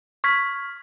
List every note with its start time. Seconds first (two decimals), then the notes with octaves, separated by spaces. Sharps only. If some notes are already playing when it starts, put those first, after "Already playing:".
0.24 C#6 F6 G#6 B6